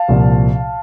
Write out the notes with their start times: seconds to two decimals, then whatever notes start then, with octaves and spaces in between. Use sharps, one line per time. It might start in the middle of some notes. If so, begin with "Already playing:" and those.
Already playing: F5 A5
0.08 C2 A#2 F3